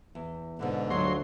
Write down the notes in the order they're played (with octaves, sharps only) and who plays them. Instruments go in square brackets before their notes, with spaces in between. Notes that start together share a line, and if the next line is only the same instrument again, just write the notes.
[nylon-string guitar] E2
[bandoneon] G#2 D3 [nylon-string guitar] B2 B3 D4
[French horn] D2 [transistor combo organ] F#3 C6 [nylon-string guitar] F4 C#5 D#5